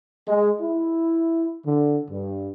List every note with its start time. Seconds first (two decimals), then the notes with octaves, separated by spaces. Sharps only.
0.27 G#3
0.61 E4
1.66 D3
2.09 G2